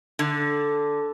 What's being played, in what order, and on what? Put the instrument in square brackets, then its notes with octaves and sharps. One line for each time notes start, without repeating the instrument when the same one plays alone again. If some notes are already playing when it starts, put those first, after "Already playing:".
[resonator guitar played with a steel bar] D3